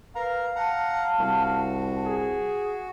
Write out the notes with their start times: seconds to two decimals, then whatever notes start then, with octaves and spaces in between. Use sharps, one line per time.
0.16 A#4 B4 F5 A#5
0.56 F#5 A5 A#5
1.19 C2 F#4
2.06 G#4